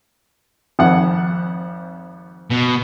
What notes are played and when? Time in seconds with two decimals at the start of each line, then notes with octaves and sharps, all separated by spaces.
0.79 G#1 F2 F#5
2.51 B2